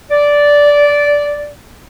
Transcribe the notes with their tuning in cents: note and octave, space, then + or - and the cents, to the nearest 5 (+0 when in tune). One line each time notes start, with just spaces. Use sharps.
D5 -10